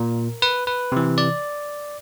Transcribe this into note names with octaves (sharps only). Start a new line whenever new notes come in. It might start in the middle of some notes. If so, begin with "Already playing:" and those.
Already playing: A#2 A#4
B4
B4
C3 E3
D5